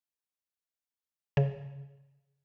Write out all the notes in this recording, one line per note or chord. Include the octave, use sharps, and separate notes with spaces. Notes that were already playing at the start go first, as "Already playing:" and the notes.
C#3